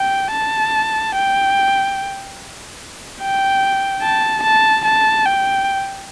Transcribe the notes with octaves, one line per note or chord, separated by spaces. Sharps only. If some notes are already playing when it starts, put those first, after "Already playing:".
Already playing: G5
A5
G5
G5
A5
A5
A5
G5